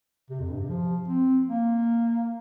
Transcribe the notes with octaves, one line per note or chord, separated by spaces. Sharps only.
C3
F2
G2
C3
F3
C4
A#3